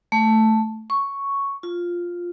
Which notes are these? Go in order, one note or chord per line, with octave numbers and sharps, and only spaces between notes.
A3
C#6
F4